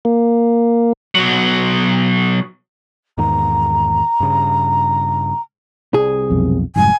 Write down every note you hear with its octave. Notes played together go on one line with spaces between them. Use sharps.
A#3
B2 F#3
E2 G#2 D#3 A#5
G2 C#3
C2 G#4
B1 F2
F1 G#2 F#3 G#5